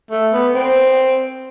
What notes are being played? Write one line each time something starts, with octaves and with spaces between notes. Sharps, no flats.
A3
B3
C4